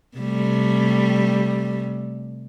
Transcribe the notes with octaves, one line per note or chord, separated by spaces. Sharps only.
C3 G3 A3